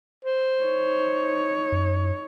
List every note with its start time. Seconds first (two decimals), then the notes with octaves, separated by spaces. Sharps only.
0.25 C5
0.62 D#4 C#5
1.72 F#2